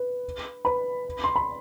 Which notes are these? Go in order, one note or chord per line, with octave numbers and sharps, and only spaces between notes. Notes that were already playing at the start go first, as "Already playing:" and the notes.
Already playing: B4
B4 B5
C6
B5